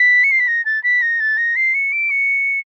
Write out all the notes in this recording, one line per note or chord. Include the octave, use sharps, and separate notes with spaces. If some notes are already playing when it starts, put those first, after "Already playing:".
Already playing: B6
C#7
C7
B6
A#6
A6
B6
A#6
A6
A#6
C7
C#7
D7
C#7